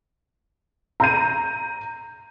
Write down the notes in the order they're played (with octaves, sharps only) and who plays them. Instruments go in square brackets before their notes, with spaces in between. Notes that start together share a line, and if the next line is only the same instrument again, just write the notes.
[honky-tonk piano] A#5 G6 D#7